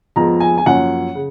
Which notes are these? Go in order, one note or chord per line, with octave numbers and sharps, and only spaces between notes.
F2 F3 G#3 B3 A#5
G#5
G#5
F#2 F3 A#3 C#4 F#5
C#3